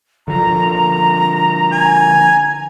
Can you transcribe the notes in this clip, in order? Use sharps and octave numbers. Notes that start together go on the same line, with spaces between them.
D3 F3 A#5
G#5